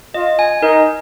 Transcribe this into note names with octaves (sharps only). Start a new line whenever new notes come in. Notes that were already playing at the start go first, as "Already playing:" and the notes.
F4 D#5
G#5
D#4 A#4